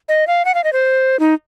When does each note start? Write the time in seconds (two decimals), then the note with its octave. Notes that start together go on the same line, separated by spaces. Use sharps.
0.09 D#5
0.27 F5
0.45 F#5
0.55 F5
0.64 D#5
0.73 C5
1.20 D#4